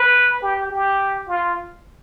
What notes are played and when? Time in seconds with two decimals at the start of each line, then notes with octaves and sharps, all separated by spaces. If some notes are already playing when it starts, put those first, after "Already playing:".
Already playing: B4
0.42 G4
0.71 G4
1.28 F4